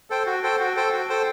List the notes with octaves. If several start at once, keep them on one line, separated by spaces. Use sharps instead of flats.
A4 C5 G5
F#4
A4 C5 G5
F#4
A4 C5 G5
F#4
A4 C5 G5